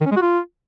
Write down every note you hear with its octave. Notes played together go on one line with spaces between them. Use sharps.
D#3
C#4
G#3
F#4
F4